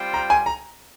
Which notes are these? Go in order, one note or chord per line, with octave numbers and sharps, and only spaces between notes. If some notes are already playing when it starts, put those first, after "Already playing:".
Already playing: G3 C4 F4 C5 G5
A#5
G#5
A#5